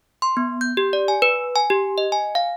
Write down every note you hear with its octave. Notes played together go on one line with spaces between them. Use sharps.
C6
B3
G6
G4
D5
G#5
B4
G#5
G4
D#5
G#5
F5